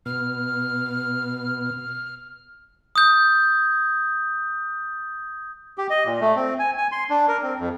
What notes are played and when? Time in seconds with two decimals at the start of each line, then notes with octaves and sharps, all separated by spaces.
0.06 B2 F6
2.96 D#6 G6
5.78 G4
5.90 D#5
6.06 A#2
6.21 A3
6.36 C4
6.59 G#5
6.78 G#5
6.92 C6
7.10 D4
7.28 A#4
7.43 C4
7.59 F2